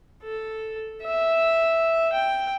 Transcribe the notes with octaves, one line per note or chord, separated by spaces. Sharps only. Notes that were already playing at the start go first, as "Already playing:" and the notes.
A4
E5
G5